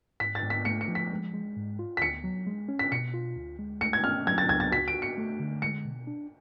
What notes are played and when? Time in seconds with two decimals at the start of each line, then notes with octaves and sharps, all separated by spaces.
0.20 G#2 B6
0.35 A6
0.43 G#2
0.50 B6
0.65 A3 C#7
0.81 C#7
0.88 F3
0.95 B6
1.11 G#3
1.34 G#3
1.56 G#2
1.79 F4
1.97 B6
2.01 D2 C#7
2.24 F#3
2.47 G#3
2.69 C#4
2.79 B6
2.92 B2 C#7
3.14 F4
3.37 D2
3.59 G#3
3.81 A3 C#7
3.93 G#6
4.04 C#4 F6
4.27 F#3 G#6
4.38 A6
4.49 C#2 G#6
4.60 A6
4.72 F#4 B6
4.88 D7
4.94 F#4
5.02 C#7
5.18 A3
5.40 D3
5.62 G#3 C#7
5.85 B2
6.07 D4